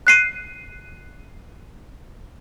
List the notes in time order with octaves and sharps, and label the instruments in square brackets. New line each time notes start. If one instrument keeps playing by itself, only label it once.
[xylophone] F#6 C7 D#7